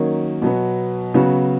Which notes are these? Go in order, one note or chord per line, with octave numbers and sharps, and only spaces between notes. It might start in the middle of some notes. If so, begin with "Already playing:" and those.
Already playing: D#3 F#3 A#3 C#4
B2 F#3 B3
C#3 F#3 B3 F#4